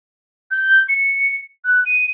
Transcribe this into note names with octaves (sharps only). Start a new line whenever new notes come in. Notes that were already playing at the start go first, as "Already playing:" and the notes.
G6
C#7
F#6
D#7